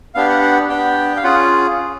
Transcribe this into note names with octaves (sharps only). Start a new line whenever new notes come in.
B3 D4 G4 F5
F#5
F#5
B3 D4 G4 G5
F5
C#4 F4 G#4 F#5